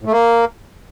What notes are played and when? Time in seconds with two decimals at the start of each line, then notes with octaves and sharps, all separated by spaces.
0.01 A2
0.07 A3
0.12 A#3